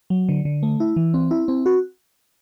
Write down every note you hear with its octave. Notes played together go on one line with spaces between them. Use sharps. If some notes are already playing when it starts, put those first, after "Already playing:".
F#3
D3
D3
A3
E4
E3
C4
E4
C4
F#4